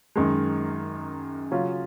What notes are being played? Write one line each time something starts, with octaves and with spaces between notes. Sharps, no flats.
F#2 D#3 G#3
C#3 F#3 C#4 F4